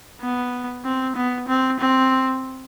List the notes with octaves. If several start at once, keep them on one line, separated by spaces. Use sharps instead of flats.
B3
C4
B3
C4
C4